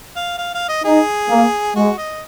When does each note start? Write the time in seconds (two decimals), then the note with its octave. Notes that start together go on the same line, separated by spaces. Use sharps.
0.16 F5
0.38 F5
0.54 F5
0.68 D#5
0.84 D#4 G#4
1.30 A#3
1.75 G#3 F#4
1.98 D#5